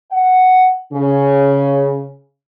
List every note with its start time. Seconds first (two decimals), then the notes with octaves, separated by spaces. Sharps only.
0.11 F#5
0.93 C#3